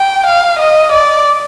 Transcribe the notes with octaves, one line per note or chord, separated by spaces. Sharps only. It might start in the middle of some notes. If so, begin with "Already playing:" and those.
Already playing: G5
F5
D#5
D5